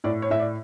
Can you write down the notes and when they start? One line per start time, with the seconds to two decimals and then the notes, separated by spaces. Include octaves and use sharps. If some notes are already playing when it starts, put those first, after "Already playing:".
0.04 A2 D5
0.22 C#5
0.30 A2 E5
0.39 D5